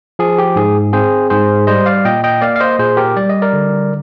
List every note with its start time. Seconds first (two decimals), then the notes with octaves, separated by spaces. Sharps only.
0.19 F3 G#4
0.38 G4
0.56 G#2 G#4
0.93 C4 G#4 C5
1.30 G#2 G#4 C5
1.67 G3 C5 D#5
1.86 D5 F5
2.05 A#2 D#5 G5
2.24 D#5 G5
2.41 A#3 D5 F5
2.56 F5
2.60 C5 D#5
2.78 A#2 G#4 C5
2.97 G4 A#4
3.16 G3 D5
3.30 D#5
3.42 A#4 D5
3.53 D3